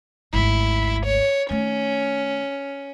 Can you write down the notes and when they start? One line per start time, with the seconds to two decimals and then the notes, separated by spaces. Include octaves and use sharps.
0.33 G#1 D2 E4
1.05 C#5
1.50 D#3 A3 C#4